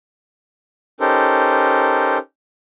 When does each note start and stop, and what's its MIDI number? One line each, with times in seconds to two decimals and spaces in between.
1.00 2.18 61
1.00 2.18 63
1.00 2.18 67
1.00 2.18 69
1.00 2.18 70
1.00 2.18 72